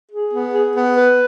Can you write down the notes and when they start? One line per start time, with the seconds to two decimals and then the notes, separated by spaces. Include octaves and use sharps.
0.12 G#4
0.33 B3
0.54 G#4
0.75 B3
0.97 B4